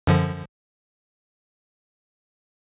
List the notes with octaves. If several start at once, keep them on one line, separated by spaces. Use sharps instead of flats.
F#2 D3 F3